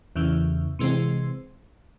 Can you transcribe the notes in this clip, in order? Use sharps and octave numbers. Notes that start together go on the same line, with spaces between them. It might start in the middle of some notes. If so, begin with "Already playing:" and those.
E2 C#3 E3
C3 E3 G#3 C4